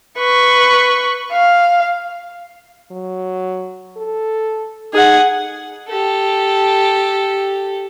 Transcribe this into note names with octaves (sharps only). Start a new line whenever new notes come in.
B4 C#6
F5
F#3
A4
D#4 G#4 F#5
G4 A4